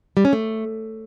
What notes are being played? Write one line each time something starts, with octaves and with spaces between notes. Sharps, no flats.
G3
C#4
A3